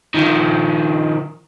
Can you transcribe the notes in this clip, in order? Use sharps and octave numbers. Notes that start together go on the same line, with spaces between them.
D#3 F3